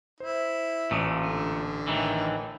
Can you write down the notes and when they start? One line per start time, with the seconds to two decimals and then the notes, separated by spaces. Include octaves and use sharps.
0.20 E4 C5
0.91 A1 A#2 A3 D#6 C#7
1.20 D3
1.87 A2 D#3 E3